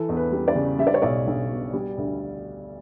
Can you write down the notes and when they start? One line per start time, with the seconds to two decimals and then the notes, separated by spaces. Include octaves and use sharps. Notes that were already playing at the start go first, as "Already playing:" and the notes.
Already playing: E3 A4
0.09 E2
0.16 B4
0.32 G3
0.48 D5
0.55 C#3
0.79 G3 E5
0.87 D5
0.94 C#5
1.02 B1 D5
1.27 B1
1.51 B2
1.73 G3
1.97 D2